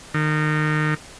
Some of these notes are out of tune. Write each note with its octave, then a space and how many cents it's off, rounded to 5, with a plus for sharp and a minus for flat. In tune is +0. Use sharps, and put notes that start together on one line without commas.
D#3 -25